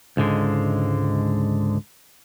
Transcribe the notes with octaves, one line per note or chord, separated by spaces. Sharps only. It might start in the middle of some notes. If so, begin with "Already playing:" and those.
C#2 G#2 D3 G#3